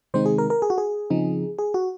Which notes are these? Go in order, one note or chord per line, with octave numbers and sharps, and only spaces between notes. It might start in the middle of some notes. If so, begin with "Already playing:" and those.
C3 D#3 G#3 C4 D#4 C5
G#4
A#4
A#4
G#4
F#4
G#4
C#3 F3 C4 D#4
G#4
F#4